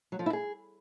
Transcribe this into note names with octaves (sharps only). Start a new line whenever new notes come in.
F#3
F3
E4
G#4